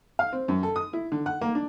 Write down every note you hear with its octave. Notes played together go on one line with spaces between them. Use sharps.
F5
C4
F#2
A4
D#6
E4
D3
F#5
A#3
D4